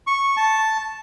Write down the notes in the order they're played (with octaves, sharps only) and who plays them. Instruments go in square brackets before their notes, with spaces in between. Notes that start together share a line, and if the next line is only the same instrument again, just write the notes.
[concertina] C#6
A5